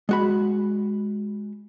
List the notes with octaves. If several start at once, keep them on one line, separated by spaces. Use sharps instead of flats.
G#3 F#4 B5